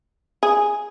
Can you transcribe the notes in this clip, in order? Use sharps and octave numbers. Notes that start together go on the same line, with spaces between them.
G#4